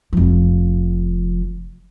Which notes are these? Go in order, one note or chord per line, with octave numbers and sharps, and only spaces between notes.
F1 F3